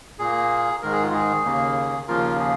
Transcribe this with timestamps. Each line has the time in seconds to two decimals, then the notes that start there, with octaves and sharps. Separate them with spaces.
0.19 A#2 A#3 G#4
0.82 G#2 D#3 G#3 A#4
0.93 G#4
1.03 F4
1.14 G#4
1.45 D#2 C#3 A#3
2.08 D#2 C#3 F3 A#3 F4 A#4
2.39 G#4